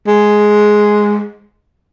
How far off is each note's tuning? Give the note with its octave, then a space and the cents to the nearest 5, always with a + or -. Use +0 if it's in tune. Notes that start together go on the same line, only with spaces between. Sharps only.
G#3 +5